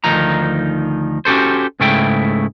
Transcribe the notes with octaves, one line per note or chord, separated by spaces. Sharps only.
D2 D#3 F3 D#4 A#5
C#4 F#4 G4 A4 C5
C#2 G#2 C#3 A3 E4 G5